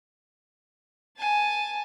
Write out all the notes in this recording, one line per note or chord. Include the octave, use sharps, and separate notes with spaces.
G#5 A5